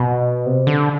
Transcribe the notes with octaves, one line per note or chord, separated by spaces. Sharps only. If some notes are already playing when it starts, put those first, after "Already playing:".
Already playing: B2
C3
D3